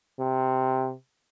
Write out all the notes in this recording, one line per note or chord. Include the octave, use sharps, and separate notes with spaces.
C3